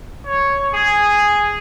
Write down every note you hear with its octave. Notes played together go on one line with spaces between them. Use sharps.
C#5
G#4